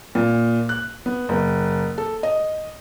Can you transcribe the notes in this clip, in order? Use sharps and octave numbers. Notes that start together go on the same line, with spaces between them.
A#2
F#6
B3
F#1
A4
D#5